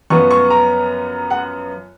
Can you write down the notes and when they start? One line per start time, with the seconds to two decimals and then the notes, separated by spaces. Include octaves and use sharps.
0.10 F#2 F3 B3 C#6
0.31 C#6
0.50 A#5
1.30 F#5